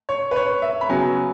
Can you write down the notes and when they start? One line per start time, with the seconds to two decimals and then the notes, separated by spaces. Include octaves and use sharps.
0.09 C#5
0.31 B4
0.36 C#5
0.62 E5
0.81 B5
0.89 C#3 F#3 B3 G#5